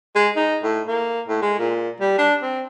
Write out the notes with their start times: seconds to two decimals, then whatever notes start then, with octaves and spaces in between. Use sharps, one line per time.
0.16 G#3
0.36 D#4
0.63 A2
0.88 A#3
1.27 A2
1.42 G#3
1.59 A#2
2.00 G3
2.18 D4
2.42 C4